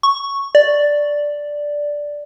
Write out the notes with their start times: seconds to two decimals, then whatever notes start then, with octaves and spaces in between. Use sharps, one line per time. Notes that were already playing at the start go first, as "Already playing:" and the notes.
0.03 C#6
0.55 D5